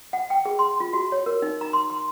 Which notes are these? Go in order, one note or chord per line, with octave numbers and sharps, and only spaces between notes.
F#5
G5
G#4
C6
F4
F#4
C#5
A#4
D#4
A#5
C6
C6